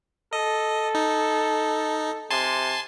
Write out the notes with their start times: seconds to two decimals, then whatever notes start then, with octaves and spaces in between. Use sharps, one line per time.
0.33 A4 D#5
0.95 D#4
2.30 C3 G#5 A5 C6